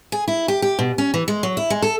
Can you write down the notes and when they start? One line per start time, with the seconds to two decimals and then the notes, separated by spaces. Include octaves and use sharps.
0.12 G#4
0.28 E4
0.48 G4
0.62 G4
0.79 B2
0.98 C#4
1.14 E3
1.28 G#3
1.43 F#3
1.57 E4
1.70 G#3
1.82 A4